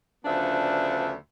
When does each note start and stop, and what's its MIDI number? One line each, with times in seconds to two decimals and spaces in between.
0.25 1.12 38
0.25 1.12 49
0.25 1.12 53
0.25 1.12 59
0.25 1.12 62
0.25 1.12 76